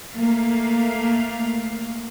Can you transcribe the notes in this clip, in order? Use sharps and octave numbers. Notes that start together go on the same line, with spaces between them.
A3 A#3 F5